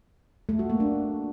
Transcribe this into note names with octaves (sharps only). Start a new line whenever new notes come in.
A3
F#4
A#3
D4